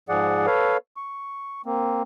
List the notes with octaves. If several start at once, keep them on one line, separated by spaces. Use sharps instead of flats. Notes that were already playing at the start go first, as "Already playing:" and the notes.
G#2 F3 G#4 D5 F#5
A4 B4 C#5 F5
C#6
A#3 C4